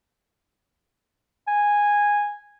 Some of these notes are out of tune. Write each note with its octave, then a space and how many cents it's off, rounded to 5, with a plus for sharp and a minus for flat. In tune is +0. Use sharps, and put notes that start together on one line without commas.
G#5 -10